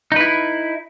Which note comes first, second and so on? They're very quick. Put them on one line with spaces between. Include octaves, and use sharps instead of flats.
D#4 B4 E4